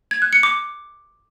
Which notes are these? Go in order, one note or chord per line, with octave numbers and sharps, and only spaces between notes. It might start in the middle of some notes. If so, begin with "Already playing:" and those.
G#6
F#6
C#7
D6